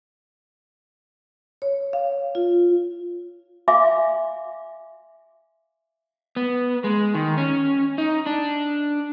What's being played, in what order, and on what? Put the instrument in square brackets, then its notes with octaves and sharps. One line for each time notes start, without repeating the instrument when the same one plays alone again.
[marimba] C#5
F5
F4
[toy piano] E5 F5 G#5 C6 D6
[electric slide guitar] B3
G#3
D#3
C#4
D#4
D4